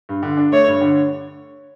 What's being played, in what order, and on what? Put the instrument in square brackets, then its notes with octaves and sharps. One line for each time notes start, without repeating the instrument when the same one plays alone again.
[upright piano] G2
D3
D4
[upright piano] A3 [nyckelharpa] C#5
[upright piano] G2
D3